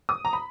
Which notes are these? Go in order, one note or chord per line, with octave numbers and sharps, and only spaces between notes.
D#6
A#5
B5